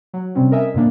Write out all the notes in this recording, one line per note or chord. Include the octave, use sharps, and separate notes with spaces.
F#3
C3 G3 C4 C#4
A#4 D#5 E5 G#5
F2 A#2 D3 A#3 D4